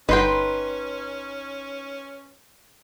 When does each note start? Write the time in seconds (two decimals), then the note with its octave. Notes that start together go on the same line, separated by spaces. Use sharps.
0.09 G1 C#4 D#4 B4 G5 C6